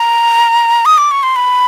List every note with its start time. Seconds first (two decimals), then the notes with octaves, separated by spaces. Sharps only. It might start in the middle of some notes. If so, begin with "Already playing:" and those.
Already playing: A#5
0.86 D#6
0.98 D6
1.11 C#6
1.23 C6
1.36 B5